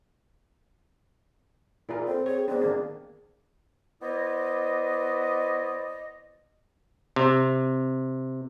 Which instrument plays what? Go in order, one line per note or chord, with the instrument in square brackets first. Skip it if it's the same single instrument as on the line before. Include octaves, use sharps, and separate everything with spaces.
[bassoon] A#2 [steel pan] E4 G#4 A#4
[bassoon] C4 [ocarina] A4
[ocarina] G#4 [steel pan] C#5
[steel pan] B3 D4 [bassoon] C4 [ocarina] G#4
[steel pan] D#3 A#3 D4
[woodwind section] B3 E4 C5 D5 D#5
[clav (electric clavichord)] C3